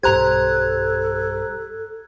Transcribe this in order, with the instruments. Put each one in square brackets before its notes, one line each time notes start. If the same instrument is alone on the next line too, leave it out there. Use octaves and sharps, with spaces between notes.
[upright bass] B1 G2 [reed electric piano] G4 C5 [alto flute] A4 [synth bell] A#5 F#6 G#6